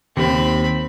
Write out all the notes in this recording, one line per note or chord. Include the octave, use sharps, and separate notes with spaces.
D#2 C4 B5